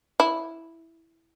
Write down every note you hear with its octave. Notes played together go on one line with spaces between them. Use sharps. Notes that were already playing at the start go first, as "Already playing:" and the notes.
E4